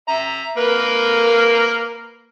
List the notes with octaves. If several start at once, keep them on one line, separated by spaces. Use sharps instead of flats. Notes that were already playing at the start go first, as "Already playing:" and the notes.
E5 A#5
A#3 A#4 B4